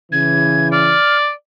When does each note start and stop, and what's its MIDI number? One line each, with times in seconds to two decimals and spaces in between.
0.12 0.95 49
0.12 0.95 52
0.12 0.68 92
0.72 1.31 74
0.72 1.17 89